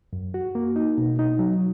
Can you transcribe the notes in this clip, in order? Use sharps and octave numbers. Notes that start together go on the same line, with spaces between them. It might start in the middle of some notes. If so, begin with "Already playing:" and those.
F#2
F#4
A#3
D#4
B2
D#4
F#3